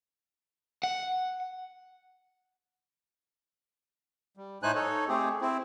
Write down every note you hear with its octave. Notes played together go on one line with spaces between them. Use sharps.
F#5
G3
A2 A3 D#4 C5 G#5 F#6
D#4 A4 C#5
A3 C4 G4 G#4
C4 E4